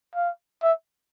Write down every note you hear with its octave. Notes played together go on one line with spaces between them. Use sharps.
F5
E5